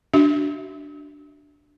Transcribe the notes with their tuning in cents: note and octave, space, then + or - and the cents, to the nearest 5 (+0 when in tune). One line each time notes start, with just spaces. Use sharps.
D4 +0 F#4 +25 E5 +0